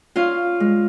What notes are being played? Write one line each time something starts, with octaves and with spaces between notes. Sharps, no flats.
C#4 F4 F5
G#3